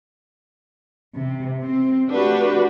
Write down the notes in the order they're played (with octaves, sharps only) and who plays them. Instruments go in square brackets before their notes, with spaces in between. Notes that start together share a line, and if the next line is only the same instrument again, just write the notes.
[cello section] C3
C4
[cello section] A3 F#4 [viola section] D4 G4 B4